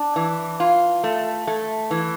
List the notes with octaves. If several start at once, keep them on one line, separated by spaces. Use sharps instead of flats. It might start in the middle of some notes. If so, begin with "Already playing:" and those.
Already playing: D4
E3
F4
A3
A3
E3